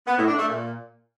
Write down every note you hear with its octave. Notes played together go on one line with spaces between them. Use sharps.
B3
A2
D4
A3
A#2